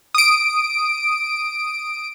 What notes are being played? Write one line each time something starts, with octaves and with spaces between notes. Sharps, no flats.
D#6 D7